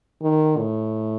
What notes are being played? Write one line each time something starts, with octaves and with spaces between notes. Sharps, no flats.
D#3
A2